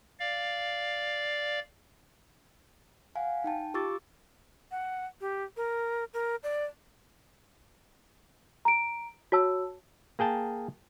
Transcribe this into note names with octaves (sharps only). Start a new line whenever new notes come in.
D5 F5
F5 F#5 G#5
D#4 G5 A5
F4 G4 C#6 D6 E6 A6
F#5
G4
A#4
A#4
D5
A#5 D7
F#4 C#5 A5 E6
A#3 G#4 G5 A5